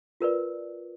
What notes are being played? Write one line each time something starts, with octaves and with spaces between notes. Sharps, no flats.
F4 A#4 B4 D5